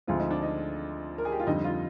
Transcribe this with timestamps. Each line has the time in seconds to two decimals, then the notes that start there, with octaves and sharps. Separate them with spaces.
0.07 D2 D3 F3 G#3 C4 F4
0.19 D#4
0.30 D4
0.42 D#4
1.18 A#4
1.25 G#4
1.32 G4
1.40 F4
1.47 F2 D3 G3 D#4
1.64 F4